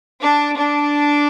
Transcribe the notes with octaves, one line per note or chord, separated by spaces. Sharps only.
D4
D4